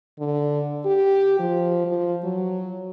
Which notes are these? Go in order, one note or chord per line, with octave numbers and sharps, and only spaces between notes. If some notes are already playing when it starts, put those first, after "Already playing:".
D3
G4
F3
F3
F#3